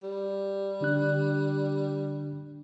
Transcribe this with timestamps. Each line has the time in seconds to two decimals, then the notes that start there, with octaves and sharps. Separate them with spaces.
0.03 G3
0.81 D3 D4 F#6